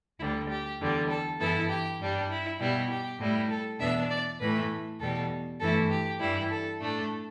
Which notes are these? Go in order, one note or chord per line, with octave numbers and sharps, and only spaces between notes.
D2 D3 G3 E4
G4
E2 D3 G3
A4
G2 E3 B3 E4 A4
G4
G2 G3 D4
E4
B2 G3 E4
G4
A2 G3 E4
A4
E2 B2 B3 D4 E5
D5
A2 E3 A3 B4
E2 B2 G3 A4
G2 E3 A3 E4 A4
G4
G2 E3 G3 E4
A4
A2 A3 D4